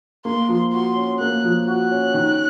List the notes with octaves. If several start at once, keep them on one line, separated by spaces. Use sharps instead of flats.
A#3 C6
F3
F#4 C6
C#4
A#3 F#6
F3
F#4 F#6
C#4
D#3